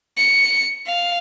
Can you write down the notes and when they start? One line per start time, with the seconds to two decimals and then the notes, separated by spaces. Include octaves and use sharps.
0.18 C#7
0.87 F5